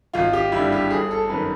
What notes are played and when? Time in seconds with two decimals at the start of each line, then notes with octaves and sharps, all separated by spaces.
0.13 G#1 F4
0.33 G4
0.52 G2 D3 G3 E4
0.72 G4
0.90 G1 G#4
1.11 A4
1.29 F#2 D#3 B4